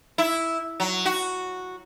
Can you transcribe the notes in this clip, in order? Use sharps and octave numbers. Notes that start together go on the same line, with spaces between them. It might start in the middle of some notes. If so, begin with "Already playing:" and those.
E4
F#3
F#4